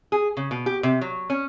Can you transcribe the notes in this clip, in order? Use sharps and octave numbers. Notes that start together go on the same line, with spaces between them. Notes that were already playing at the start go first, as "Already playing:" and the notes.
G#4
C#3
B2
G4
C3
F#3
C#4